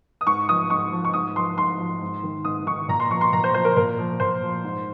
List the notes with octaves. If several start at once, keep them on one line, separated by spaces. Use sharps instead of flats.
D#6
G#2 C#6
F3 D#6
G#2 C#6
F3
C#6
G#2 D#6
F3 C6
G#2 C6
F3
G#2
D#3
G#2 D#6
D#3 C#6
A#2 A#5
C6
F3 C#6
C6
A#2 A#5
C5
F3 C5
A#4
A#2 A#4
F3
A#2 C5
F3
G#2